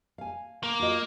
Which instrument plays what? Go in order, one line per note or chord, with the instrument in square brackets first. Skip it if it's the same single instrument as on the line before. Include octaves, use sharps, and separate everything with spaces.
[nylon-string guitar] F5 G#5
[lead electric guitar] A#3
[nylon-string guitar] F4 F#4 D#5